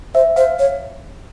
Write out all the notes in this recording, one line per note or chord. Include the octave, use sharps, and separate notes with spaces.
C5 E5
C5 F5
C#5